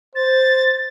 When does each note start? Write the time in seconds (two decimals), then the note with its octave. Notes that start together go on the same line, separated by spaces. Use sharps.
0.15 C5 A6